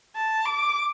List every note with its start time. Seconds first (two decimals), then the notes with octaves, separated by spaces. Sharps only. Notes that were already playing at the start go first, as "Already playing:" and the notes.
0.16 A5
0.46 D6